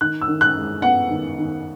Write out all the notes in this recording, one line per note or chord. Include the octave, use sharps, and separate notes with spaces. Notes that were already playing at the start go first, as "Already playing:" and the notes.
D#3 F#6
E6
D#3
F#6
G#3
B3 F#5
D#3
D#3